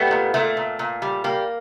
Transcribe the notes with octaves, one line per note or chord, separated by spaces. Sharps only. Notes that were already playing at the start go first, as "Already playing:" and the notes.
Already playing: G3 A3 B3
A#2
A#2 A3
A#2
A#2
G3
G3 A#3